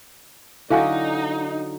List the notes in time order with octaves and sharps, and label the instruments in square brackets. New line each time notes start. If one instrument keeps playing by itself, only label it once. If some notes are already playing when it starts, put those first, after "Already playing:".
[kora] D3 F#3 F#4 [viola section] D#4 [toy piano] E4 F5 G#5